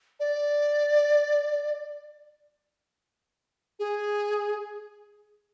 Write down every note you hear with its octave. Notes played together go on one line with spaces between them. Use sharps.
D5
G#4